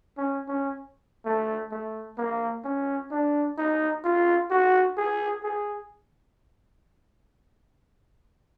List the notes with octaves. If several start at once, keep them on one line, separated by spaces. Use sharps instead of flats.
C#4
C#4
A3
A3
A#3
C#4
D4
D#4
F4
F#4
G#4
G#4